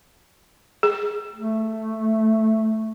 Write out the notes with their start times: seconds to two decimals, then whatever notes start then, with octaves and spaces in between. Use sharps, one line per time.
0.83 G#4
1.35 A3